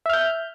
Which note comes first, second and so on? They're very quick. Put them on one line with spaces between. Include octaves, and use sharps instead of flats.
E5 F6 G6